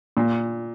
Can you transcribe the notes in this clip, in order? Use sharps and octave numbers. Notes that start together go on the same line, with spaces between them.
A#2